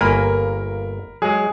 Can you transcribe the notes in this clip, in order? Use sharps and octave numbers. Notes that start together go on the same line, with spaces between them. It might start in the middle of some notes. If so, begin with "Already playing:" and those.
G1 A#3 A#4 G#5 B5
F#3 G#3 G#4